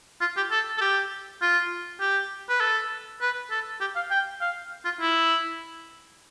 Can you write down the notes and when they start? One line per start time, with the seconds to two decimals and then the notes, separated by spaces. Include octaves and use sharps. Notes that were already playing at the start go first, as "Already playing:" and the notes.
0.21 F4
0.37 G4
0.51 A4
0.77 A4
0.81 G4
1.42 F4
2.00 G4
2.49 B4
2.61 A4
3.21 B4
3.50 A4
3.81 G4
3.96 F5
4.11 G5
4.41 F5
4.85 F4
5.01 E4